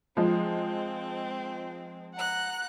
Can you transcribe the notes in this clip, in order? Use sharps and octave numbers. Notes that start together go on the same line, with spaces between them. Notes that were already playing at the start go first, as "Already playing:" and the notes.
F3 G#3 C4
F#5 A#5 F#6